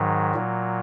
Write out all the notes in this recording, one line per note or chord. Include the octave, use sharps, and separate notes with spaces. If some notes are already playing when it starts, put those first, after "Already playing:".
Already playing: G#2 D#3 F#3
A#2 F#3